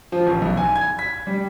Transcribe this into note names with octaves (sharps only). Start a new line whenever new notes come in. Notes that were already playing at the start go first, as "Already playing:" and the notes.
F3
A1
B1
G#5
G#6
B6
G3